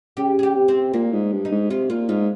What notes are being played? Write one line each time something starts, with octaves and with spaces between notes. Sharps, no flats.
C#3 G4
G#4
G4
C3
C4
A#2 A#3
G#2
G2
D#4
G#2
C3 F4
A#2 F4
G#2 F4